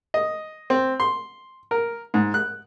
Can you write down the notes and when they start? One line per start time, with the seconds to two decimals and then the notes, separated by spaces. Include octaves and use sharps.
0.14 D#5
0.70 C4
1.00 C6
1.71 A#4
2.14 G#2
2.34 F#6